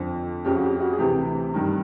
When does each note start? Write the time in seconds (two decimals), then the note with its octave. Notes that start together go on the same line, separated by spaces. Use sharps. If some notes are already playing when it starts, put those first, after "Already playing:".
Already playing: F2 D3 F3
0.44 F2 C#3 F3 G4
0.55 F#4
0.63 G4
0.80 F#4
0.92 G#4
0.98 D2 C3 E3 G4
1.54 G2 D#3